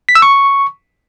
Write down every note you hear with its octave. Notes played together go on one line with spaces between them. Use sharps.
B6
E6
C#6